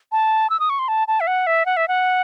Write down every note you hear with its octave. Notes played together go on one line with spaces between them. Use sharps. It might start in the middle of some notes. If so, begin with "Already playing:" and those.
A5
E6
D#6
C#6
C6
A5
A5
E5
F#5
E5
F#5
E5
F#5